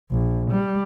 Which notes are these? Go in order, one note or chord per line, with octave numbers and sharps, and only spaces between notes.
A#1
G3